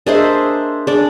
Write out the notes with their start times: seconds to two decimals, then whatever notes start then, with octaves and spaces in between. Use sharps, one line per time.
0.07 D4 G#4 A#4 C5 D#5 E5
0.87 D4 G#4 D5